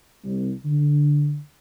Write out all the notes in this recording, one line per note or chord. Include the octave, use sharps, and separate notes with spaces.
C2
D3